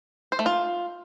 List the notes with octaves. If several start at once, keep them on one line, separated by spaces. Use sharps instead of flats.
C5
A3
F4